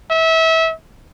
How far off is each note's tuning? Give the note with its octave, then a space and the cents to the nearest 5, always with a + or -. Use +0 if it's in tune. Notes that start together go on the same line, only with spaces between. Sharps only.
E5 -25